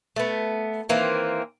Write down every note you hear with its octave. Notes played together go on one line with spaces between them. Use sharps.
A3 B3
D#3 E3 A#3 C4